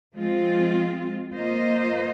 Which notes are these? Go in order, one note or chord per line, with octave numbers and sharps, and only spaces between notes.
F3 G#3 C4 F4
A#3 F4 C5 D#5